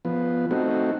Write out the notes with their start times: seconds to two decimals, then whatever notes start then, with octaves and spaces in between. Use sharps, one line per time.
0.05 F3 B3
0.51 A3 C4 D#4 F#4